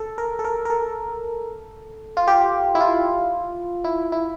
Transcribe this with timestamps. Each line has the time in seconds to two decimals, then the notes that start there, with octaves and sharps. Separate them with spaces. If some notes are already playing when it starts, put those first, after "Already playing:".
Already playing: A4
0.18 A#4
0.39 A4
0.44 A#4
0.65 A#4
0.70 A4
2.17 F4
2.28 G4
2.75 E4
2.80 F4
3.84 E4
4.12 E4